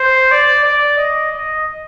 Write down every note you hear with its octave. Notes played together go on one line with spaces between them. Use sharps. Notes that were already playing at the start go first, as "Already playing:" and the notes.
Already playing: C5
D5
D5
D#5
D#5